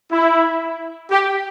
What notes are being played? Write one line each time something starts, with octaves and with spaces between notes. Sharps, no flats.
E4
G4